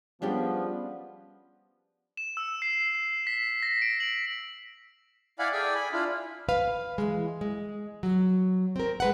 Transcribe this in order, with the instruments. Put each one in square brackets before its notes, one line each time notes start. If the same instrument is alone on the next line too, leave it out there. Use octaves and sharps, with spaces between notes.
[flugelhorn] F3 [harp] G3 D4 [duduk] B3 [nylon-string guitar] C#4 G4 G#4
[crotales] E7
E6
C7
C7
B6
A#6
D7
F#7
[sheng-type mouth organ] E4 D5 F5 F#5 G#5 B5
G#4 A4 D5 G5 G#5
G#5 B5
D4 E4 F4
[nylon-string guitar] B4 F5
E3 G#3
G#3
F#3
C4 A#4
G#3 B4 F#5